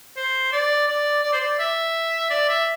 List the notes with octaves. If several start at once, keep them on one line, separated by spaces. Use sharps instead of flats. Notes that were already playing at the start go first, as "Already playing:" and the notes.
C5
D5
D5
D5
C5
D5
E5
D5
E5